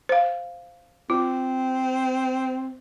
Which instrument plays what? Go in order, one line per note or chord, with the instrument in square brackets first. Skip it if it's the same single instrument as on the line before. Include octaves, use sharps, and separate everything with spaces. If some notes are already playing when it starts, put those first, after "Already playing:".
[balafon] C5 F5
[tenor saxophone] C4 [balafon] F4